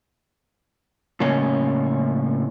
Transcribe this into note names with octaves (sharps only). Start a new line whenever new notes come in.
A2 C#3 A#3 C#4 C#5 D#5